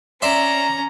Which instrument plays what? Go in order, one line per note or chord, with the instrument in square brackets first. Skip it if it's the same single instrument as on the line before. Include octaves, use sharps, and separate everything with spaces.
[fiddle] C#4 A#5 [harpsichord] D5 E5 C6